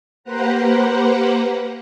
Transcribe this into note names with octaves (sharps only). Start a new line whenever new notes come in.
A#3 G4 B4 C5 F#5 A#5